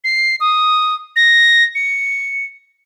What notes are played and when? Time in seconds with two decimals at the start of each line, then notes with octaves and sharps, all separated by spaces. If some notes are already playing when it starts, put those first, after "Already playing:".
0.04 C7
0.40 D#6
1.16 A#6
1.75 C#7